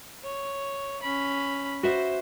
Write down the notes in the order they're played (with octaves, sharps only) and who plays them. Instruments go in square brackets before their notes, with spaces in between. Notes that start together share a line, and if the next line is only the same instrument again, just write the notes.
[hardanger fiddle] C#5
C#4 B5
[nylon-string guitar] F#4 B4 E5 [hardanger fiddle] C5